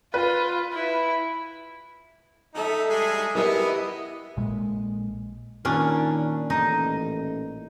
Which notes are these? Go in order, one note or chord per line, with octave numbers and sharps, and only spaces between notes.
F4 B4
E4
D#4 A4 E5
G3 G#3 G#4
B3 E4 G4 A#4 D#5 E5
A#1 A#2 G#3
A#2 D#3 C#4 D4
A1 D#4 D#5